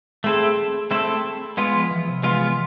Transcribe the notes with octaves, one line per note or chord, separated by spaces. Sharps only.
A3 C4 E4 G#4 A4
A3 C4 E4 A4
G#3 B3 F4
F3
E3
C3
G#3 B3 F4